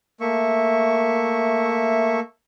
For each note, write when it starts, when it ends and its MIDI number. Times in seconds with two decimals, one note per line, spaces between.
0.21 2.20 57
0.21 2.20 58
0.21 2.20 76
0.21 2.20 85